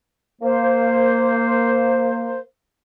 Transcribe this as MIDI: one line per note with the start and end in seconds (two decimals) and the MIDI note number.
0.42 2.39 58
0.42 2.39 72